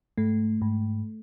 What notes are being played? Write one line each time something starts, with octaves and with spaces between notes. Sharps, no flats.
G#2 A3
G#2